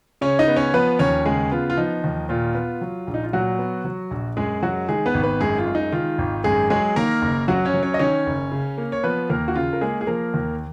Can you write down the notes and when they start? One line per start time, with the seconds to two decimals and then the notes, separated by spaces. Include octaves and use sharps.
0.21 C#3 C#4 C#5
0.39 D#4 D#5
0.48 B3
0.56 C#4 C#5
0.74 F3 B3 B4
0.99 D#2 C#4 C#5
1.26 C#3 G#3 G#4
1.51 B3 F4
1.70 F4
1.77 F3 D#4
2.04 D#2
2.29 A#2 F4
2.55 B3
2.81 F#3
3.07 A#1
3.14 D#4
3.24 F4
3.33 A#2 F#3 F#4
3.59 B3
3.85 F#3
4.11 A#1
4.37 F#2 G#3 G#4
4.62 F#3 G#3 F#4
4.89 D#3 G#3 G#4
5.06 B3 B4
5.14 G#1
5.23 B3 B4
5.41 F#2 G#3 G#4
5.58 F4
5.67 G#3
5.75 D#4
5.92 D#3 F4
6.18 G#1
6.44 F#2 G#3 G#4
6.70 F#3 G#3 G#4
6.96 D#3 A#3 A#4
7.22 F#1
7.48 F#2 F#3 F#4
7.65 C#4 C#5
7.74 F#3
7.83 C#4 C#5
7.94 D#5
7.99 D#3 C#4 C#5
8.26 F#1
8.52 C#3
8.78 A#3
8.92 C#5
9.04 F3 B3 B4
9.29 D#2 A#3 A#4
9.48 F#4
9.55 C#3 F4
9.73 A#4
9.81 G#3 A#3 G#4
10.01 G#4
10.07 F3 A#3 A#4
10.34 D#2